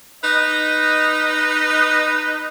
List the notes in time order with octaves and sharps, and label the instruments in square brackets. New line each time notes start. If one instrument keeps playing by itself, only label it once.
[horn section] D#4 B4 D#5